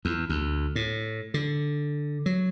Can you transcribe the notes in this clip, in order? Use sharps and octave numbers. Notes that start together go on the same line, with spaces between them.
E2
D2
A2
D3
F#3